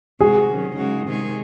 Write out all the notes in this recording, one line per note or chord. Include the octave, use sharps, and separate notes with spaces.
C3 D#3 G#3 D#4 F#4 G#4
D#3 F#3 C#4
C#3 G#3 D#4 F#4
C3 D#3 G#3 D#4 G#4